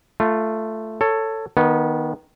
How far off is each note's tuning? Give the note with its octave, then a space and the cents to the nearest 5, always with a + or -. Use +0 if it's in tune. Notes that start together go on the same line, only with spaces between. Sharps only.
A3 +0 F4 -10
A4 +15 C#5 +0
D#3 +0 B3 -25